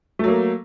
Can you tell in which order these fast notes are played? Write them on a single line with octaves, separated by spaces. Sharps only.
A3 F#3 A#3